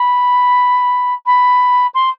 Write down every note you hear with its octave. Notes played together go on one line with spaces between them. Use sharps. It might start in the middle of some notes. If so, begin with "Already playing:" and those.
Already playing: B5
B5
C6